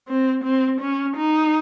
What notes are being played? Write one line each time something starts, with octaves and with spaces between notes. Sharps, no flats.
C4
C4
C#4
D#4